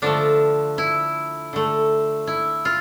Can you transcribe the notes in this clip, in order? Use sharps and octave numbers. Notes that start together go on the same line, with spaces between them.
D3 F3 A3 D4
E4
D3 A3
E4
F4